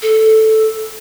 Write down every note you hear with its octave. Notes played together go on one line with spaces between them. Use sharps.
A4